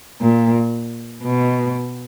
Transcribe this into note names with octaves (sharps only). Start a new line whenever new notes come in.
A#2
B2